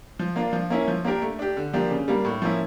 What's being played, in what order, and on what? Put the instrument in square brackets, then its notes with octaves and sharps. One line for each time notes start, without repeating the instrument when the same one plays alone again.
[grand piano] F3
A#3 D4 F4
F3
A#3 C#4 E4
F3
A#3 D4 G4 A#4
A3
D4 G4
D3
F3 A#3 D4 G4
C#3
G3 A#3 D4
A2
F3 A#3 C#4 E4